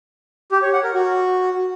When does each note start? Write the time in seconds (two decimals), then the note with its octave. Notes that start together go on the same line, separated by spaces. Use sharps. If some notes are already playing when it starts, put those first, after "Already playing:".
0.52 G4
0.62 C#5
0.73 F#5
0.83 A#4
0.94 F#4